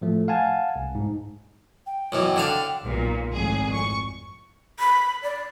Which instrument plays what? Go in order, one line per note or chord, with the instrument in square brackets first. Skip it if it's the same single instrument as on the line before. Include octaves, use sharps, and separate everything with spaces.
[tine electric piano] A2 F3 A3
F5 F#5 G#5 A5
C2
G#2
[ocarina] G5
[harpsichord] F#2 B2 E3
D3 D4 F5
[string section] B1 A#2
G#1 F2 A2 G#4
C#6
[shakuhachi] B5
D5